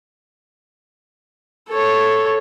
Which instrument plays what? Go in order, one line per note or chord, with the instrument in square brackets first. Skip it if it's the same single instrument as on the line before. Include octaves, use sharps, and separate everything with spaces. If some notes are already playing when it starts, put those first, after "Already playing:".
[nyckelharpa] A4 C#5